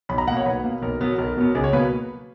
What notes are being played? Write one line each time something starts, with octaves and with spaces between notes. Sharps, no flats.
B1 B5
A#5
B2 A#3 F#5
C#5
B1 B4
B2 A#3
B1 A#4
B2 F#3 B3
B1 A#4
B2 F#3 B3
C#2 G#4
C#5
B2 F#3 A#3 B4